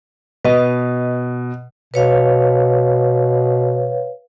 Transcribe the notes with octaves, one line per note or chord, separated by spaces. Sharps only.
B2 B4 D#5
B2 B4 C#5 F5